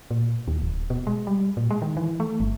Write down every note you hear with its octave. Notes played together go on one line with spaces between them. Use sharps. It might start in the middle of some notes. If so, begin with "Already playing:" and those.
A#2
D#2
D1
B2
G#3
G3
A#2
G#3
D#3
E3
A3
G1